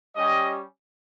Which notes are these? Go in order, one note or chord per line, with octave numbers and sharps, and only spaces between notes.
G3 C#4 G4 D#5